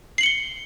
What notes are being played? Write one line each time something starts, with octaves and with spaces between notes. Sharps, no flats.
C7 C#7 F#7 G7